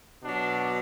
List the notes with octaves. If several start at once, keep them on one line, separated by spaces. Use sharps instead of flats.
B2 F#3 D4